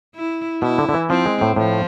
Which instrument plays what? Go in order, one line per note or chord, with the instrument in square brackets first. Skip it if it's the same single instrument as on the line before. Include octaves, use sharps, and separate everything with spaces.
[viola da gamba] E4
[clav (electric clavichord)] B2 [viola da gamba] E4
[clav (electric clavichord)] D3
D3
E3
[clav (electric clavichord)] F3 [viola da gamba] C4
[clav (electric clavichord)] G#3
A2
[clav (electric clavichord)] A2 [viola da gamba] F3